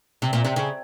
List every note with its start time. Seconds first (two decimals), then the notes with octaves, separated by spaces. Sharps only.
0.22 C3
0.33 A#2
0.45 C3
0.56 C#3